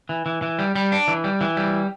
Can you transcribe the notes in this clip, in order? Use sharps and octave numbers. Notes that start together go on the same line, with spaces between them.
E3
E3
E3
G3
G3
D4
E3
G3
E3
G3